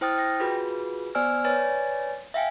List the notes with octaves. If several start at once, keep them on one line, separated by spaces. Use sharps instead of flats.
E4 C5 G5 D#6 F6 A6
G5 A#6
F4 F#4 G#4 B4
B3 C5 D5 G#5 E6 F6
B4 C#5 D5 G#5 A6
E5 F5 G5 G#5